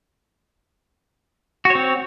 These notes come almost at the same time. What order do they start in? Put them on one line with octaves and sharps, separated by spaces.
F#4 C#5 C4